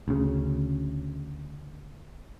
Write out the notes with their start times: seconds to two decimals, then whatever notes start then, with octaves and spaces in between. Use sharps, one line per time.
0.08 D2 C#3